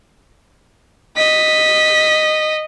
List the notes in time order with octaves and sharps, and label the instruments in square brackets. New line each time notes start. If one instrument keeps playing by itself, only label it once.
[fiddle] D#5 [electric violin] B6